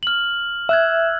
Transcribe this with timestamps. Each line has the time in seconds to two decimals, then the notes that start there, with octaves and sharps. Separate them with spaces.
0.03 F6 F#7
0.69 E5 E6 F#6 G#6